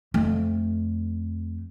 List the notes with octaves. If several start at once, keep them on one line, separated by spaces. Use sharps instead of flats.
F2 A3